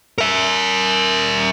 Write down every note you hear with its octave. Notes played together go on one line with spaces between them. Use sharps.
A#4 E5